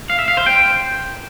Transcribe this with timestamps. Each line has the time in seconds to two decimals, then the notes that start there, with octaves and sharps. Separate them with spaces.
0.10 F5
0.19 E5
0.28 F5
0.37 C5
0.46 G5